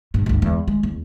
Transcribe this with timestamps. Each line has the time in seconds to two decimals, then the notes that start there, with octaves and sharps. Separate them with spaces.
0.14 G2 A#2
0.26 G1 C#2
0.42 E2 G#3
0.68 G#3
0.83 E2